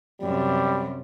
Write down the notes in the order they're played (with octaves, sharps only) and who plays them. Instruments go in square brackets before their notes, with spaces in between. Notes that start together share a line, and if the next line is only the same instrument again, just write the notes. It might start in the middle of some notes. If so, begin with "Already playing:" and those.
[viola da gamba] F#2 C3 [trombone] G3